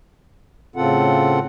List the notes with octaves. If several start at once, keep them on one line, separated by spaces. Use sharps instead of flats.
A2 C#3 C4 F4 A4 F#5